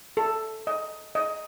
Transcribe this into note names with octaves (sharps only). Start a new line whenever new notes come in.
A4
D#5
D#5